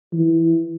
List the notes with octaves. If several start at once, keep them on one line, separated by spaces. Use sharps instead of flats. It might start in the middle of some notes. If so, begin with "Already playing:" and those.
E3